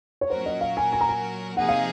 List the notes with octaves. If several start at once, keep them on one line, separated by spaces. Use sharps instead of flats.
C#5
A#2 F#3 C#4 F#4 A#4 C5
D#5
F5
G#5
G#5
A#5
G#5
C3 F3 A#3 D#4 G#4 F#5
F5